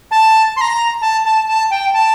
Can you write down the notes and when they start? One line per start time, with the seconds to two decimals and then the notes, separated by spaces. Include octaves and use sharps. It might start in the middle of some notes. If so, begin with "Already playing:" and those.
0.11 A5
0.56 C6
0.61 A#5
1.02 A5
1.25 A5
1.48 A5
1.70 G5
1.93 A5